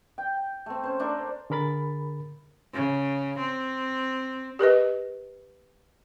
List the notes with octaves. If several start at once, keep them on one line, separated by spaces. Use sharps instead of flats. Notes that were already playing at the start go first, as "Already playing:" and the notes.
G5
A3 C4
C#4 C5
A3 D4 A#4 C5
D3 G#4 A#4 B5 A6
C#3
C4
G4 A#4 B4 D#5